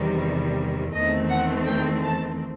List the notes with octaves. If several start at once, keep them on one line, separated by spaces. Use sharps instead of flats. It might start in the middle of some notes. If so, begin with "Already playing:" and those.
Already playing: E2 C3 D#3 G3
E2 D#3 A3 C4 D#5
F#5
G5
A5